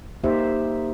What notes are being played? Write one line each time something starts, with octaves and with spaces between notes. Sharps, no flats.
A#3 D#4 G4 C5 E5